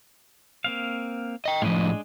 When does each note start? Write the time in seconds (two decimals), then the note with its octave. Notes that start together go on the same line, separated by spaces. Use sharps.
0.64 A#3 C4 F5
1.45 D#5 G5
1.62 A2 F3 G#3 D4 D#5